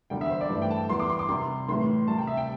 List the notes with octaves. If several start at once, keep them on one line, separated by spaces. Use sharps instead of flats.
E2 D3 G3 G5
E5
C5
D5
G2 E3 A3
G5
A5
E2 E3 G3 C6
D6
C6
D6
C3 G3 C6
A2 E3 G3 C6
C3 G3 A5
G5
E5
G5